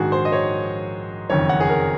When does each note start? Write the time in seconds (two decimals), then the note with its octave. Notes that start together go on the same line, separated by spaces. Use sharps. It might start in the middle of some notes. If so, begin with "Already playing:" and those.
Already playing: A#1 G#2 D#3 F#4 G#4
0.12 C5
0.25 D#5
0.32 C#5
1.30 F#1 F2 D#3 C#5
1.49 F#5
1.60 G#4
1.69 A#4